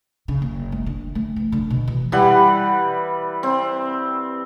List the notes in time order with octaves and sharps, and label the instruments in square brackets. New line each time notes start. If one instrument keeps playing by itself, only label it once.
[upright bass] C#3
F#1
G#3
D3
A3
E3
D3
B2
E3
[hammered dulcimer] E3 G3 B4 F#5
C4